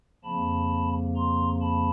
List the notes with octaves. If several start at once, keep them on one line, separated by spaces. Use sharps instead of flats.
F2 C#3 F3 A#3 A5 B5
A#5 C6
A5 B5